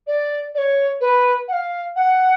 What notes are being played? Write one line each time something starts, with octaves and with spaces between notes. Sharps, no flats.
D5
D5
C#5
B4
F#5
F5
F#5